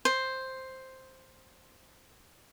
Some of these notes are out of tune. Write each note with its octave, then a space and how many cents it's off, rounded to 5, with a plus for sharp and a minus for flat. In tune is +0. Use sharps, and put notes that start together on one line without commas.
C5 +5